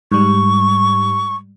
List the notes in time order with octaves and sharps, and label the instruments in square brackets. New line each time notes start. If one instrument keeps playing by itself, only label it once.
[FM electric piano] G#2 G3 [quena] C#6